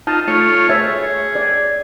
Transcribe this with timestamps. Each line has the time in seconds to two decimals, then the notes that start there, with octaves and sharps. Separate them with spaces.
0.07 D#4 F4 A5
0.28 A3 F4 C#5
0.69 G#4 C#5 E5
1.35 D5